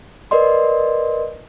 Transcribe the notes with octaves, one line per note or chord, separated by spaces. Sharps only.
A#4 B4 D5 D#5 C6